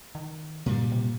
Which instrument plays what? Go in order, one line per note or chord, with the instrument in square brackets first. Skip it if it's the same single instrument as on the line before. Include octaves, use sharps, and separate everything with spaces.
[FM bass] D#3
[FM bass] G2 [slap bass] A#2 G3
[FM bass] C3